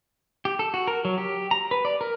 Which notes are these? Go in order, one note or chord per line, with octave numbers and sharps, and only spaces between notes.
G4
A4
F#4
A#4
F#3
G4
A#5
B4
D5
A#4